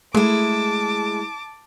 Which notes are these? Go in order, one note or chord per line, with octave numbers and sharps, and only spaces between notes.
G#3 A3 E4 A5 D6